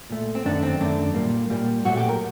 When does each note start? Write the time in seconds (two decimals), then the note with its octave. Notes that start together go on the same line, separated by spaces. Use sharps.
0.10 A#2 A3
0.35 C4
0.45 F#2 D#3 A3 D4
0.63 C4
0.80 F#2 D#3 A3 D4
1.15 A#2 G3 A#3
1.50 A#2 G3 A#3
1.85 A#2 F#3 A3 F#4
1.97 G4
2.09 A#4